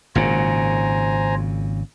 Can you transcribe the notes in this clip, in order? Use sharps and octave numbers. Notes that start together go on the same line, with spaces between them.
G#1 A#2 C#3 C5 G#5 A#5